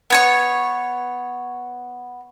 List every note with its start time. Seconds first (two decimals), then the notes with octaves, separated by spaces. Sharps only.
0.10 B3 C#5 C#6